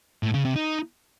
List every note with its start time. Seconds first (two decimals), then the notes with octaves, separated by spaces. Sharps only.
0.23 A2
0.34 C#3
0.45 C3
0.56 D#4